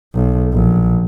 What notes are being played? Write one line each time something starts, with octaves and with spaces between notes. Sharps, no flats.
B1
A#1